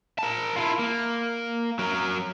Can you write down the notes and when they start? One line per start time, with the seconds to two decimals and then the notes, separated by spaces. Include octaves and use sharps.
0.19 A#4 A5
0.56 E4 F4
0.79 A#3
1.79 F#3 A#4